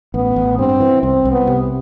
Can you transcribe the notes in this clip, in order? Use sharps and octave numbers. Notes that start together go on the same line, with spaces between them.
A1 B3
A1
G2 C4
E3
C2 C4
C2
B3
C3